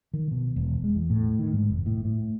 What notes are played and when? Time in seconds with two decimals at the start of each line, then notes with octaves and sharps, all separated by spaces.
0.14 D#3
0.31 B2
0.56 E1
0.84 G#3
0.95 E2
1.10 A2
1.39 D#3
1.53 G#2
1.69 F1
1.86 A2
2.05 A2